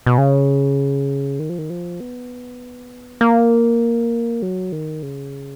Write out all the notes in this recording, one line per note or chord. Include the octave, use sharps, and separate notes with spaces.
B2
C#3
D#3
F3
D#3
F3
B3
A#3
F#3
D#3
C#3